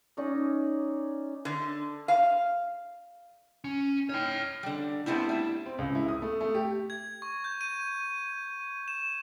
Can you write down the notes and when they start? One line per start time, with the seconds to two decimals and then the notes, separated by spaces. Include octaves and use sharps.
0.17 C#4 D#4 D5 D#5
1.45 D3
2.08 F5
3.64 C#4
4.09 D#4 C#5 G5 F6
4.63 D3 G3
5.06 G3 A3 B3 C4 E4
5.29 G3 E4
5.66 C4
5.78 C#2
5.95 E4
6.08 D#6
6.22 A3
6.41 A3
6.55 G4
6.90 G#6
7.22 C#6
7.44 G6
7.61 D#7
8.88 E7